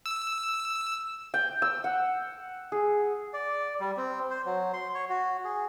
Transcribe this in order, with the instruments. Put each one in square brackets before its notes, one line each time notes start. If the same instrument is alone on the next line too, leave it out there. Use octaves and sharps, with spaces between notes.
[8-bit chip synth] E6
[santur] G5
E6
F#5
G#4
[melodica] D5
G3
C4
C5
F#3
C6
C#5
F#4
G#4